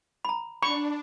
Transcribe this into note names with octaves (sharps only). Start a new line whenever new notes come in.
A#5 B5
D4 B5 C#6